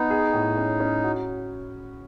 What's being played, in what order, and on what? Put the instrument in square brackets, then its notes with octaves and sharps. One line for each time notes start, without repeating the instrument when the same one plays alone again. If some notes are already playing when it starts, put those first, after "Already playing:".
Already playing: [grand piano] B3 [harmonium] D#4
[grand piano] G#4
A2
C#4
C#4
F#4